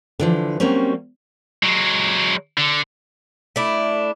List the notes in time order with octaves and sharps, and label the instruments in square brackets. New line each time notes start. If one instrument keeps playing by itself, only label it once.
[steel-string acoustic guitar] D3 E3 F3
F#3 G3 A#3 C4 C#4
[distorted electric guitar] F#3 G#3
D3
[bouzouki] A3 D4 E4